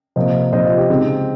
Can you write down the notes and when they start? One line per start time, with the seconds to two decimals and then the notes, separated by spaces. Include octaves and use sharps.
0.16 C3 F3 A#3 C5 D#5
0.53 C3 F3 A#3 C5 D#5
0.65 F4
0.77 G4
0.89 C#3 G#3 C4 D#4